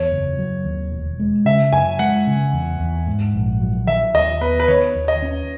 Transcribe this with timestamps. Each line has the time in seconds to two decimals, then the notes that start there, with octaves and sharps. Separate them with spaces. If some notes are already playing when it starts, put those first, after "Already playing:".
Already playing: E2 C#5
0.12 F#1
0.39 F#3
0.65 D#2
0.92 E1
1.20 G#3
1.45 C#3 E5
1.72 F#2 G#5
1.99 G#3 F#5
2.27 C#3
2.53 E2
2.80 E2
3.06 G#2
3.34 A#1
3.61 F#3
3.87 D#3 E5
4.14 D#2 D#5
4.41 B3 B4
4.60 B4
4.68 D#3 C#5
4.95 D#2
5.08 D#5
5.22 C#4